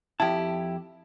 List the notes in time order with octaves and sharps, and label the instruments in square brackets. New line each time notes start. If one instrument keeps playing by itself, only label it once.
[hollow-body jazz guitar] F2 A5 [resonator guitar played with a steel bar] E4 G4